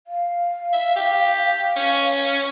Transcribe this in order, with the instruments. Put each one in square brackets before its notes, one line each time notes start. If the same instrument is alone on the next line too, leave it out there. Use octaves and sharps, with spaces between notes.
[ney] F5
[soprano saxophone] E5
G4
C#4